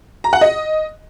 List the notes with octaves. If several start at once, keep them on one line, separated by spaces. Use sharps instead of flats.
A#5
F#5
D#5